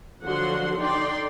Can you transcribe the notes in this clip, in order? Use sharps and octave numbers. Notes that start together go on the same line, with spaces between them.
D3 F3 F#3 F#4 F#5 C6
D3 D#4 D5 G5 C6